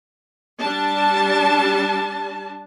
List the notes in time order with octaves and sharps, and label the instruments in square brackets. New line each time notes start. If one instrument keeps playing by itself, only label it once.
[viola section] G3 D4 A5